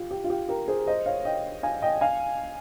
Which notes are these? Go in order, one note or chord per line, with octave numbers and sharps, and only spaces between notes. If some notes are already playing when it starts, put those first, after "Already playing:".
Already playing: F4 G4
G4
F4
G4
G4 A#4
G#4 C5
C5 D#5
C#5 F5
D#5 G5
F5 G#5
D#5 G5
F5 G#5